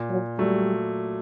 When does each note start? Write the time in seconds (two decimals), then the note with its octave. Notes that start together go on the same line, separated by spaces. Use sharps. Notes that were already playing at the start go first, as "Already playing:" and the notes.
Already playing: A#2
0.10 F#3
0.39 F#3 G3 A3